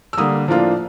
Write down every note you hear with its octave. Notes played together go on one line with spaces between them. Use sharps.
E6
D3 G3 A#3 D#6
A2 F3 A#3 D4 F4